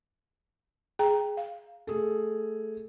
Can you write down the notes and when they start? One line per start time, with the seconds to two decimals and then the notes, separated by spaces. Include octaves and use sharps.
0.99 G#4 G5 A#5
1.37 F5
1.87 A3 G#4 A4